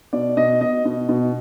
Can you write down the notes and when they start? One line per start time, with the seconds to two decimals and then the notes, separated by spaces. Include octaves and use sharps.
0.13 B2 D5
0.37 B2 D#5
0.61 B2 D#5
0.85 B2
1.09 B2